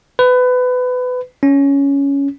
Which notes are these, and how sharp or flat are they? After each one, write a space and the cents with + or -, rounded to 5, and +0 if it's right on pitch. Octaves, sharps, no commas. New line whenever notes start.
B4 +25
C#4 +10